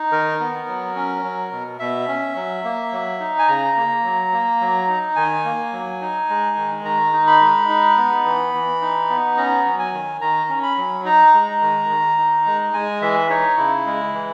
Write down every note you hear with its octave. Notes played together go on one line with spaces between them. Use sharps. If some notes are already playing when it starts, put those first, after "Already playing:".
Already playing: D#4
D#3 A#4
B3
F#3
C#4
F#3
B2
B2 E5
C#4
F#3
A#3
F#3
D#4
G#5
C#3 A#5
A#3
F#3
A#3
F#3
D#4
D#3 G#5
A#3
F#3
D#4
G#3
D#3
D#3 A#5
D#4
B5
G#3
D#4
B3
E3
E3
D#4
B3
C#4 A#5
F#3
G#5
D#3
D#3 A#5
C#4
B5
F#3
D#4 A#5
G#3
D#3
D#3
D#4
G#3
G#3 G#5
E3 E5
D#4 C#5
C#3 E4
G#3
E3